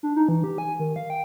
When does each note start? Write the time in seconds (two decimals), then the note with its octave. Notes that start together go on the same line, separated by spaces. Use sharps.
0.03 D4
0.16 D#4
0.28 E3
0.44 G4
0.58 G#5
0.79 D#3
0.96 F5
1.10 G5